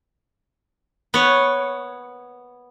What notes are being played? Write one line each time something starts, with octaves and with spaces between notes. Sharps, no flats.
B3 C#5